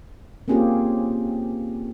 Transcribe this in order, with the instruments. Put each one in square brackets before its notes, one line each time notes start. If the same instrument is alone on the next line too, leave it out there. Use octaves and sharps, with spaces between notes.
[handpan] A#3 C4 C#4 F4 G4 G#4